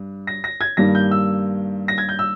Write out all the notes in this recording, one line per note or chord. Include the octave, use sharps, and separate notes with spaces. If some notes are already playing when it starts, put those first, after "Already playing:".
Already playing: G2
A#6
A#6
G#6
G2 D#3 G3 A#3 A#6
G6
E6
A#6
G#6
G6
E6